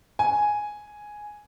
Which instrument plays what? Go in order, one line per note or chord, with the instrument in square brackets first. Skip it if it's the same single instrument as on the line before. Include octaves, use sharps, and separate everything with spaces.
[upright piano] G#5